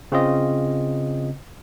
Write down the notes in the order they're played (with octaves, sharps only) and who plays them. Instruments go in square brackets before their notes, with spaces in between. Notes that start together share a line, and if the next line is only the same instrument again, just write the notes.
[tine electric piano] C#3 C4 F4 D#5